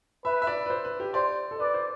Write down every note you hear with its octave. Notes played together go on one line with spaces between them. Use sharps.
B4 E5
E5
D5
B4
C5
B4
G4
C5 D5
A4
B4 D5
C5